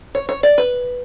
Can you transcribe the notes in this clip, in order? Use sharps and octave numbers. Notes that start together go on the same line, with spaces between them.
C#5
C#5
D5
B4